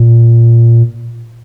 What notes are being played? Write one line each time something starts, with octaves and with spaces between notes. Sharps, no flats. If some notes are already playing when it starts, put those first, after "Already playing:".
Already playing: A#2